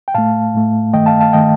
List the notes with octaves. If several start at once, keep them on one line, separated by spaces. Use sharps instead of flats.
G5
A2 A3 F5 A5
A2 A3
G2 D#3 A3 D#5 G5
F5 A5
F5 A5
D#3 A3 D#5 G5